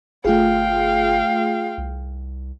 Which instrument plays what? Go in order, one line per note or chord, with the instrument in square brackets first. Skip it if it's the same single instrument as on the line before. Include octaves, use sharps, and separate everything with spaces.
[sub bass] G1 [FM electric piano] A3 F4 G#4 [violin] F5 G5
[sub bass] C2